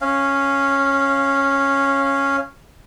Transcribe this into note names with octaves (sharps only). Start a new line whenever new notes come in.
C#4 F5